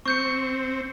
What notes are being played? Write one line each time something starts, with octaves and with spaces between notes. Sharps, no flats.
C4 C#6 G6 C#7